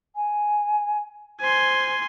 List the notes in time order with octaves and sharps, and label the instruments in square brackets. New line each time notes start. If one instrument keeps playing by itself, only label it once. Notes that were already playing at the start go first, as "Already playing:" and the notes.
[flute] G#5
[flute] C5 [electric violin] G#5 C6